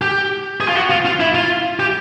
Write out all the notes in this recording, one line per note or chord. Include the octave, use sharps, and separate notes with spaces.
G4
G#4
F4
F#4
F4
F4
E4
F4
G4